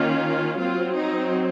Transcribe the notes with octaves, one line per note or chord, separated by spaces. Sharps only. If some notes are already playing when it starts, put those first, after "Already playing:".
Already playing: D#3 A#3 C#4 F4
F#3 C4 F4
D#4